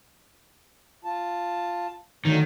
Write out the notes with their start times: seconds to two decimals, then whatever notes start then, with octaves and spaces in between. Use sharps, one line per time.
1.04 F4 A5
2.25 D3 D#3 F#3 A3